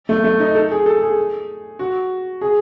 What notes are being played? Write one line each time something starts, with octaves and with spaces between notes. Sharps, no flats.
A3
A3
D#4
A4
G#4
A4
G#4
F#4
G#4